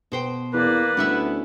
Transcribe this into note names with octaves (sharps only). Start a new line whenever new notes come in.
B2 C5 G5
E2 A#3 B4 D5
D2 B3 C#4 E4 E5